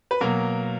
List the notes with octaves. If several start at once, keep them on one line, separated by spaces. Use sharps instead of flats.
B4
B2 F#3 A#3 A#4